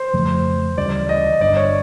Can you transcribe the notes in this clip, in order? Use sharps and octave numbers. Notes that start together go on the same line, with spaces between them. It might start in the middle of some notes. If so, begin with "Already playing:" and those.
Already playing: C5
F2 C#3 F3 A3
D2 C#3 E3 G3 D5
D#5
G1 G2 D3 D5
C#5